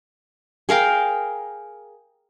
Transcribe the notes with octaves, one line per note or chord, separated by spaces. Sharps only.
G#4 A#4 F5 G5